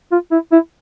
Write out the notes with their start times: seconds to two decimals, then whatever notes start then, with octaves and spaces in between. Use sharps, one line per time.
0.12 F4
0.32 E4
0.52 E4